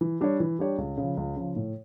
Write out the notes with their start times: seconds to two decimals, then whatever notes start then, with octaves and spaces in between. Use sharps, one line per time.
0.01 E3
0.21 G3 D4 G4 C#5
0.40 E3
0.59 G3 D4 G4 C#5
0.78 C#2
0.97 C#3 F3
1.17 C#2
1.36 C#3 F3
1.56 A2